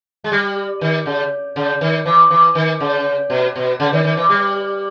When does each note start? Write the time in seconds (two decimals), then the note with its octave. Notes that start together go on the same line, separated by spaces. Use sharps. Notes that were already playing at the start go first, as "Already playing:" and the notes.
0.24 G#3
0.32 G3
0.81 D#3
1.06 C#3
1.56 C#3
1.81 D#3
2.05 E3
2.30 E3
2.55 D#3
2.80 C#3
3.30 B2
3.56 B2
3.80 C#3
3.93 D#3
4.04 D#3
4.17 E3
4.30 G3